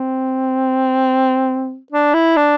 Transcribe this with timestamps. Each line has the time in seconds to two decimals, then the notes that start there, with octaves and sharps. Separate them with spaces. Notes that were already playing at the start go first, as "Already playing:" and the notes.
Already playing: C4
1.92 D4
2.14 E4
2.37 D4